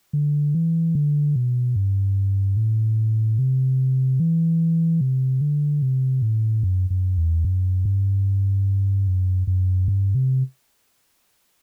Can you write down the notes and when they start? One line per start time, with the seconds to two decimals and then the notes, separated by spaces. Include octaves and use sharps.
0.13 D3
0.54 E3
0.95 D3
1.36 B2
1.76 G2
2.57 A2
3.39 C3
4.20 E3
5.01 C3
5.41 D3
5.82 C3
6.22 A2
6.63 F#2
6.90 F#2
7.18 E2
7.45 F#2
7.85 G2
9.07 F#2
9.47 F#2
9.88 G2
10.15 C3